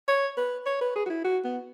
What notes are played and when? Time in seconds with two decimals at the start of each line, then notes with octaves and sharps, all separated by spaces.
0.08 C#5
0.37 B4
0.66 C#5
0.81 B4
0.96 G#4
1.06 F#4
1.10 E4
1.25 F#4
1.44 B3